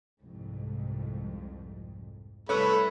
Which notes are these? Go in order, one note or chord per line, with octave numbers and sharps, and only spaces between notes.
C2 F2 G#2
C2 A3 A4 B4 C#5 B5